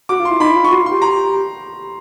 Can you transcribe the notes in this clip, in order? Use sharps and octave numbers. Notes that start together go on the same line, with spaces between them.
F#4 D6
F4
C6
E4
D#4 B5
E4
F4
C#6
F#4 C6
F4
C6
G4
A#5